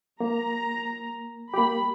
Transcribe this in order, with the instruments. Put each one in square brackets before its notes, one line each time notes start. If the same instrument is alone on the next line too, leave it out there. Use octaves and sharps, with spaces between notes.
[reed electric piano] A#3 [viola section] A#5
[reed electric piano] A#3 G4 [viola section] B5